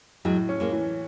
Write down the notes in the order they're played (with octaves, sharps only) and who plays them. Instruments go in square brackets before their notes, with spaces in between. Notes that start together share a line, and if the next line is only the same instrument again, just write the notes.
[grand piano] A2 [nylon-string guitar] F#3 G#3
[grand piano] C#4
[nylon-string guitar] G#3 A#3
[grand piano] E3